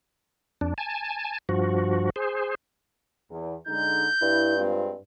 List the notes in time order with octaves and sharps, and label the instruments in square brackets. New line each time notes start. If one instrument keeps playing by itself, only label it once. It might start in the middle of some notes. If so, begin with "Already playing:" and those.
[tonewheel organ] F2 D4
G#5 A5
G2 F3 F#4
G#4 C5
[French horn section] E2
[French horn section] D3 G#3 D#4 [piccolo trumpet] G6
[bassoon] G2 [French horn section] E4
[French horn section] G#3 C4 F4